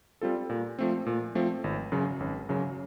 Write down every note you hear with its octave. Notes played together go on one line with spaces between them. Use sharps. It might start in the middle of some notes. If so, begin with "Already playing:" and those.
G3 C4 F4 A4
A#2
F3 A3 C4
A#2
F3 A3 C4
G#1
F#2 C#3 F#3
G#1
F#2 C#3 F#3